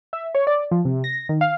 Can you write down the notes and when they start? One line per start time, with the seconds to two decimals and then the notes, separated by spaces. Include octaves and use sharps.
0.13 E5
0.35 C#5
0.47 D5
0.71 F3
0.85 C3
1.04 A#6
1.29 D#3
1.41 F5